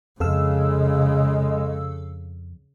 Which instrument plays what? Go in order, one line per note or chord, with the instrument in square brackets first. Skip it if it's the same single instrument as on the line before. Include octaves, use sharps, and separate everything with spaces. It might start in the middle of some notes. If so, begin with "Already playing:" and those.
[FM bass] F2 [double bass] C#3 [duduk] G#3 [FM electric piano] A4 F5 E6